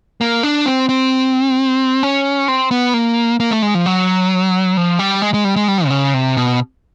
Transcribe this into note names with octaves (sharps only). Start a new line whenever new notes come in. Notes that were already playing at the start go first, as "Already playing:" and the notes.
A#3
D4
C4
C4
C#4
C4
B3
A#3
A#3
A3
G#3
F3
F#3
F3
G3
G#3
G#3
G3
G#3
G3
C3
C#3
C3
B2